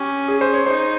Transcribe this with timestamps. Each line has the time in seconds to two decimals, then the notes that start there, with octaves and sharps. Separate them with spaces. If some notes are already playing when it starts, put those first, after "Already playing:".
Already playing: C#4 G4
0.28 G#4
0.41 C5
0.54 C#5
0.66 D#4 C5